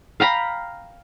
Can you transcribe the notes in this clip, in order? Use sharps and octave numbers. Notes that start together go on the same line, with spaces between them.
F5 G5 A#5 B5